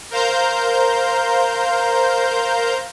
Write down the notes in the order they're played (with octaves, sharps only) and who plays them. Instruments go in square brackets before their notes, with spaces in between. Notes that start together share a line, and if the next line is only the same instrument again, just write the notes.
[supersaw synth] A#4 C5 F5 A#5 G6